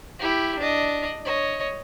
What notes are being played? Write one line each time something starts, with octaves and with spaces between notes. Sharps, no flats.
E4 G4
D4 D#5
C#5 D#5